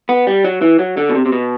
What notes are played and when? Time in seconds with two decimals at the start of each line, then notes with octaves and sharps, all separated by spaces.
0.09 B3
0.27 G3
0.44 F#3
0.62 E3
0.79 F#3
0.97 D3
1.09 B2
1.15 C3
1.26 C3
1.32 B2